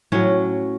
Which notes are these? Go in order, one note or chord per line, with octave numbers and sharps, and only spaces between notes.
A2 F#3 C#4